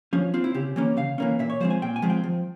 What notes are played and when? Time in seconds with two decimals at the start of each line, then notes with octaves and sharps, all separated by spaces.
0.13 F3 C#4
0.34 C4 F4
0.44 E4
0.54 C#3 G4
0.76 E3 A#3 C#4
0.97 C#3 F5
1.18 E3 A#3 C#4
1.39 A#2 E5
1.50 C#5
1.60 F3 G#3 C4 C5
1.70 G#5
1.82 A#2 G5
1.96 G#5
2.02 F3 G#3 C4
2.10 G5
2.24 F3